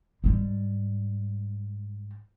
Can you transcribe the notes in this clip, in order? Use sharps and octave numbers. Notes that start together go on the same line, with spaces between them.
G#2 G3